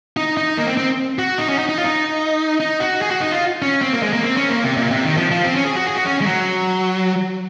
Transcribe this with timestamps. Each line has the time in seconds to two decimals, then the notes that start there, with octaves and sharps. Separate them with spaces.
0.17 D#4
0.37 D#4
0.57 A#3
0.67 C4
0.77 C4
1.19 F#4
1.38 D#4
1.49 C#4
1.59 D#4
1.69 D#4
1.78 F4
1.85 D#4
2.60 D#4
2.80 F#4
3.02 G#4
3.11 F#4
3.21 D#4
3.32 F4
3.62 C#4
3.82 C4
3.93 A#3
4.03 G#3
4.13 A#3
4.23 C4
4.37 C#4
4.49 A#3
4.64 C3
4.77 A#2
4.91 C3
5.04 D#3
5.17 F3
5.31 F3
5.44 C4
5.55 C#4
5.65 G#4
5.76 F#4
5.86 G#4
5.95 F#4
6.06 C#4
6.21 G#3
6.26 F#3